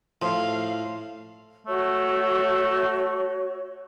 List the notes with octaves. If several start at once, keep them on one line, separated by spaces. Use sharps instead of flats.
A2 F3 F5 C6
A3 F#4 C#5